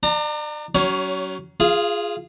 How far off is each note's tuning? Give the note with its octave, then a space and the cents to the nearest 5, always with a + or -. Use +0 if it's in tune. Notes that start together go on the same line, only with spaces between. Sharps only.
D4 +30 A#5 -25
F#3 +30 C#4 +25 C#5 +0
F4 +0 G#4 +0 F5 -35